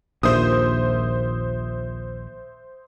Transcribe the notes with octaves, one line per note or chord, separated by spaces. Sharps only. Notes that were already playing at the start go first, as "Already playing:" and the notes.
A#1 D#2 A#2 C5 E5 D#6